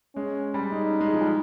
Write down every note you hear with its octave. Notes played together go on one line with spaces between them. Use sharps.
G#3 C#4
G3
G#3 D#4
G#3
F3
G3